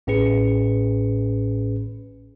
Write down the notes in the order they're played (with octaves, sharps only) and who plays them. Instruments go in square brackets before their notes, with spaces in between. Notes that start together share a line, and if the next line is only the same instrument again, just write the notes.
[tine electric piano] A1 A2 C#4 G#4 B4 C#7